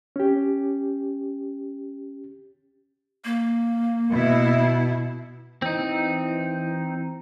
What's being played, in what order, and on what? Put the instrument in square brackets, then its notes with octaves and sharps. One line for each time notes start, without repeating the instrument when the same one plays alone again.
[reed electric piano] C#4 G4
[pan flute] A#3
[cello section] B2 E4
[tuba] E3 [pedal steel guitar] C4 D#4